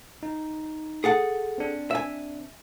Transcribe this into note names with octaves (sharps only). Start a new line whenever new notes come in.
D#4
G#4 A4 F#5
C4 D4
E5 G#5